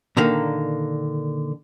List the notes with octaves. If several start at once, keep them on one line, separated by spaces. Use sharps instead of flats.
A#2 D3 D#3 A#3